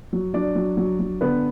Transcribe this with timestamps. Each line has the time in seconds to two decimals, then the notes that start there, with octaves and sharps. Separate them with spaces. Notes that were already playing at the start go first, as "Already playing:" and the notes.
0.13 F#3
0.34 F#3 D4 D5
0.55 F#3
0.77 F#3
0.99 F#3
1.21 D3 B3 B4